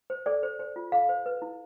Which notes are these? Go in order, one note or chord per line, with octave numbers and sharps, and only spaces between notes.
C5
A4 D5
C5
C5
F4
A4 F5
C5
B4
E4